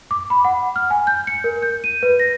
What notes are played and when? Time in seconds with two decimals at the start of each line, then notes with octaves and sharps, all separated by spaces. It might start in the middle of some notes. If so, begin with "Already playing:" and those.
0.11 D6
0.30 B5
0.45 F#5
0.76 F6
0.90 G#5
1.07 G6
1.27 C#7
1.44 A#4
1.62 G6
1.84 D#7
2.03 B4
2.20 A#6